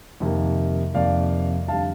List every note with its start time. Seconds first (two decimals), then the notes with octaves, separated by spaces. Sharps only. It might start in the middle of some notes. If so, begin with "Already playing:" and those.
0.20 F2 C3 D#3 A#3
0.94 F2 C3 D#3 A#3 D5 F5
1.68 F2 D3 G3 F5 A5